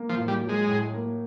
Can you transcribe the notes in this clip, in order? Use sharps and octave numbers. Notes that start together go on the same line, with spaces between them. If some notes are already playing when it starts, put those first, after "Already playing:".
Already playing: A#3
F3
A2
G3
F#3
G#3
A2
A#3